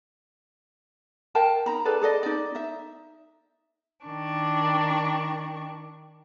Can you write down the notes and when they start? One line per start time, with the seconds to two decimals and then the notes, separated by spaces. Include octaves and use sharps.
1.35 A#4 F5 G5 A5
1.66 D#4 A#5 B5
1.85 G#4 A4 B4 D5
2.02 G#4 A4 D5 D#5
2.23 D#4 D5
2.55 D#4 E5
4.06 D#3 D4 C#6